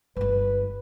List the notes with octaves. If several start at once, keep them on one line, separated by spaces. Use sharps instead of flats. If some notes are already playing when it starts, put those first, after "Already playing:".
G1 E4 B4